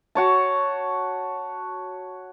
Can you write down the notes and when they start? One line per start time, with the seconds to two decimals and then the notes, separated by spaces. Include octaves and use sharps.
0.15 F#4 C#5 A5